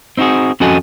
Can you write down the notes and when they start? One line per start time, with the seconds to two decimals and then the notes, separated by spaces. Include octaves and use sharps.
0.17 C4 D#4 F4 F#4 G#4
0.60 F2 C#4 F#4 A4 D#5 G#5